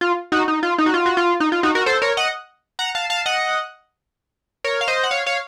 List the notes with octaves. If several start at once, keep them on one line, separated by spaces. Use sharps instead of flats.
F4
D#4 F#4
D#4
F4
D#4
F#4
F4
F#4
F4
D#4
F4
D#4 F#4
F#4 A#4
A4 C5
A#4 C#5
D#5 F#5
F#5 A#5
F5 A5
F5 A5
D#5 F#5
A#4 C#5
F5
C5 D#5
F#5
C#5 F5
C#5 F5